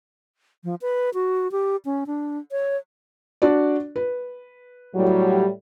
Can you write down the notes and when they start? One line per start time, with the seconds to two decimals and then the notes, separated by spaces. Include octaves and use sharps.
0.64 F3
0.81 B4
1.14 F#4
1.52 G4
1.85 C#4
2.07 D4
2.52 C#5
3.42 D4 F#4 D5
3.96 B4
4.95 A2 F#3 G3